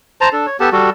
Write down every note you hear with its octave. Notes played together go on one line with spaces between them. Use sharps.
C5 A5 A#5
D4 A4
C#5
B3 G4 A4 A5
G3 F#4 A4